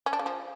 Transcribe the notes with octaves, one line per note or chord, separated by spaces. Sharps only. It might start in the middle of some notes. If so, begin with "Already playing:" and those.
C#4
D4
C#3
F3